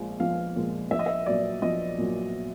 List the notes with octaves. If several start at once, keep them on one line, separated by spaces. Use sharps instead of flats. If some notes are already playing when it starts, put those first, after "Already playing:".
Already playing: A#1 A#2 F3 G#3
A#1 F5
A#2 F3 G#3
A#1 E5
D#5
E5
A#2 F#3 D5
A#1 D#5
A#2 F#3